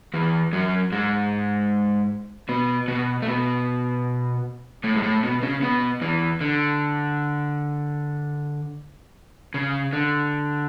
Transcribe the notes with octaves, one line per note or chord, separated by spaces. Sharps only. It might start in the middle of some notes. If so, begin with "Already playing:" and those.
E2 E3
F#2 F#3
G#2 G#3
B2 B3
B2 B3
A3
B2 B3
A2 A3
G#3
A2 A3
B2 B3
C#3 C#4
B2 B3
E2 E3
D3
C#3
D3